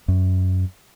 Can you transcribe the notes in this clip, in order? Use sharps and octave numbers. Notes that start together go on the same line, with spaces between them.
F#2